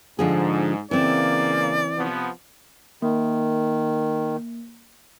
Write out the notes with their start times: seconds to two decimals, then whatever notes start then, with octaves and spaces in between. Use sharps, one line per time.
0.19 G#2 D3 F3 G#4
0.91 C#3 E3 A#3 C4 D5
1.97 C3 F3 B3
3.02 D#3 A#3